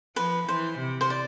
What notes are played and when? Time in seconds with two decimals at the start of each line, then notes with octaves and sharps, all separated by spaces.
0.16 F3 B4
0.48 E3 C5
0.79 C3
1.01 C5
1.10 D5